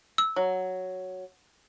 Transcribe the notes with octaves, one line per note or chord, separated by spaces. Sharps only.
E6
F#3